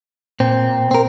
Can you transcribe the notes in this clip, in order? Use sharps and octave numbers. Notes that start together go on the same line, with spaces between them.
A#2 C4
C4 A#4